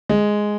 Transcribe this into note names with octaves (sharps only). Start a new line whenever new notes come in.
G#3